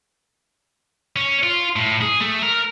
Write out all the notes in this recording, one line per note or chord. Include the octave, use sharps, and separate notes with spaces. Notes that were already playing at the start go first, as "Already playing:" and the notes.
C#4
F4
A2
G#4
A3
A#4